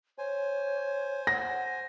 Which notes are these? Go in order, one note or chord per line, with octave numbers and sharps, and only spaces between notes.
C5 C#5 G#5
F#5 A#6